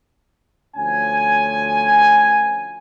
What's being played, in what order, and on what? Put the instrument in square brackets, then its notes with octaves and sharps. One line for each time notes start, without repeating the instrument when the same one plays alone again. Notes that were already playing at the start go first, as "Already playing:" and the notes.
[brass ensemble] D2 F3 C#4 G#5